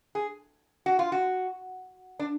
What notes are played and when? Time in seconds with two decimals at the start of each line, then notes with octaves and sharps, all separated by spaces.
0.15 G#4
0.86 F#4
0.99 F4
1.12 F#4
2.19 D4